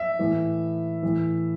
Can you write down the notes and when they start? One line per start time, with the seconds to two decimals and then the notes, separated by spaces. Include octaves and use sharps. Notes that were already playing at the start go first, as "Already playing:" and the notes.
Already playing: E5
0.19 A2 E3
1.03 A2 E3